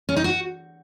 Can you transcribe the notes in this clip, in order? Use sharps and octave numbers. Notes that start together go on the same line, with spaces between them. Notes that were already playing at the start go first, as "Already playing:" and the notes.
C#4
D#4
F#4